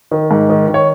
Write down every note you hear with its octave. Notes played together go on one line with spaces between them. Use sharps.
D#3
G#2
D#3
D#3
C#5